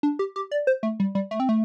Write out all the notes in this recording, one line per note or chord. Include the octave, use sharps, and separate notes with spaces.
D4
G4
G4
D5
C5
A3
G3
G3
A3
C4
A3